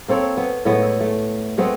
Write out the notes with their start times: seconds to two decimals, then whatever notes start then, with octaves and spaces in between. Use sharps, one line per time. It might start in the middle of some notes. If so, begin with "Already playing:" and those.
0.08 A#3 C4 A4 C#5
0.37 B3
0.65 A2 G#3 A3 B3
0.82 E4
1.01 A3
1.58 G#3 A3 B3 C4